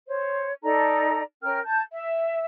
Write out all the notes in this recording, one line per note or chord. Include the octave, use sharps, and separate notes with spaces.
C5 C#5
D#4 A4 D5 A#5
C#4 A#4 G5 F6
A5 G6
E5